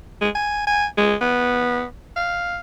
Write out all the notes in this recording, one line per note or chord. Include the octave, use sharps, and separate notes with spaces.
G#3
G#5
G#5
G#3
B3
F5